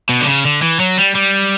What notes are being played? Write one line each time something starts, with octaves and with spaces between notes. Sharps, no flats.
B2
D3
C#3
D3
E3
F#3
G3
G3